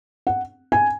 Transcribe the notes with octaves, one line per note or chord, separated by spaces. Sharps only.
F#5
G#5